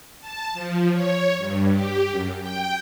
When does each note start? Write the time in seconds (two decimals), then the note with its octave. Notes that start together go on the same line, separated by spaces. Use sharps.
0.21 A5
0.53 F3
0.92 C#5
1.38 G2
1.71 G4
2.10 F#2
2.41 G5